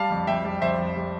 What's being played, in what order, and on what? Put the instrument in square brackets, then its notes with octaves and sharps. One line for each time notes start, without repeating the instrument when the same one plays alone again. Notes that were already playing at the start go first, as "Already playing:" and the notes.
Already playing: [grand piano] G3 F5 A5
F2
F2 E5 G5
G3
F2 C5 E5
F2
G3